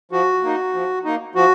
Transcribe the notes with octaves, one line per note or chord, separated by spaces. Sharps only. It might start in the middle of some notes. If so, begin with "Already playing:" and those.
F3 F#4
A#3 D#4
F3
A#3 D#4
F3 F#4